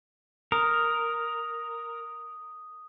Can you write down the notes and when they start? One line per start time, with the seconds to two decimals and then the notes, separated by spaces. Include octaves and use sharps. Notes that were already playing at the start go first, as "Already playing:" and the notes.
0.52 A#4 D#6